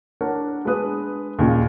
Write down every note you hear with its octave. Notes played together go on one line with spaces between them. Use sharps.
D4 A#4 C#5 F#5
G#3 B3 D4 B4 D#6
D#2 A#2 C#3